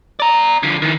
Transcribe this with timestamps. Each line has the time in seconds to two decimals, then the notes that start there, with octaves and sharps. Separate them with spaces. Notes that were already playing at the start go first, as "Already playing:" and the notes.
0.20 D5 A#5
0.63 D3 F3
0.82 D#3 E3